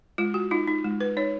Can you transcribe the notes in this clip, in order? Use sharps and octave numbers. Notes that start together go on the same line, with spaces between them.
G#3 F4
F#4
D#4 F4
D#4
G#3
B4
D#4 C#5